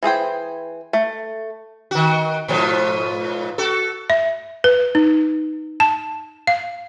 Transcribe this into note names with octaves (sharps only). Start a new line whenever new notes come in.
E3 G#4 C5 G5
A3
D#3 F#4
G#2 B2 F3
F#4 A4
E5
B4
D#4
A5
F5